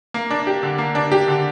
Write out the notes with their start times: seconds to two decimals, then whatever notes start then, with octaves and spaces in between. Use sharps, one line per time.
0.14 A#3
0.30 D4
0.47 G4
0.63 D3
0.78 A#3
0.95 D4
1.12 G4
1.28 D3